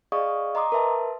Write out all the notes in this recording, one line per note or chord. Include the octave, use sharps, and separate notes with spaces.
G#4 D5 D#5 F5 C#6 D#6
D#5 A#5 C6 D6 D#6
A#4 B4 E5 A5